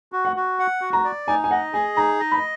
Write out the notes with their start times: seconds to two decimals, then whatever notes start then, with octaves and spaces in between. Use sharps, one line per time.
0.12 F#4
0.25 F#5
0.36 F#4
0.59 F#5
0.81 F#4
0.93 A#5
1.04 D5
1.28 D#4 G#5
1.44 G#5
1.51 D#5 F#5
1.73 G#4 G#5
1.97 D#4 A#5
2.20 D#5
2.31 B5